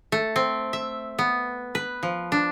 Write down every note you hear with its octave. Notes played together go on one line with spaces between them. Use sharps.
A3
C4
E5
B3
B4
F3
D4